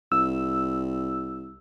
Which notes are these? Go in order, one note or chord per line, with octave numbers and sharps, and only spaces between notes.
C2 E6